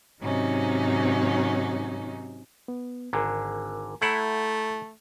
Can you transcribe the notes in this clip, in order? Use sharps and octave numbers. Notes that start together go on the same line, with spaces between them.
G#2 C3 D#3 F#3 C#4 D#4
B3
G#1 D3 A#4 G#5 A#5
A3 E4 F#5 A#5 B5 G6